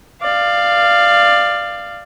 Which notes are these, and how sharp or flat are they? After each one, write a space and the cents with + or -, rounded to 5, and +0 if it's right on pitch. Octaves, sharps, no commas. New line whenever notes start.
D5 +20 F5 -5